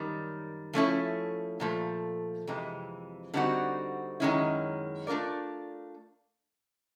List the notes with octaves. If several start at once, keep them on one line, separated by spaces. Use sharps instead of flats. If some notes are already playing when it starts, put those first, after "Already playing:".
Already playing: F#2 D#3 G3
F3 A3 C#4 E4
A#2 F3 A3
F2 C3 E3 G#3
D3 G3 C4 D#4 F#4
F#2 D#3 G#3 C#4 E4
A3 D4 F4 A#4 D5